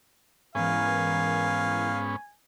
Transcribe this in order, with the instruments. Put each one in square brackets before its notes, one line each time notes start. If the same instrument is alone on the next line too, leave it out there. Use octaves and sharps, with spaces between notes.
[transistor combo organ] G#2 B3 C#4 [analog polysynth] E3 A#4 [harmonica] F5 [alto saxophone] G#5